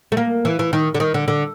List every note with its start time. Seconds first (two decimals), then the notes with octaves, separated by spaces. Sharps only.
0.12 A3
0.17 A#3
0.45 E3
0.59 E3
0.73 D#3
0.95 D3
1.00 D#3
1.14 D3
1.28 D3